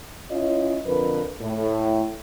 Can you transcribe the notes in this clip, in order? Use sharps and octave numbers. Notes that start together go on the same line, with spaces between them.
C#4 E4 F4 C#5 D#5
F2 D3 A#4 B4
A2